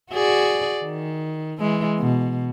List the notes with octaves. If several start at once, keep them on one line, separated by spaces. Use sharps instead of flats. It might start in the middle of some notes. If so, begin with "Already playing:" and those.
F#4 G#4 D5
D#3
E3 G#3
B2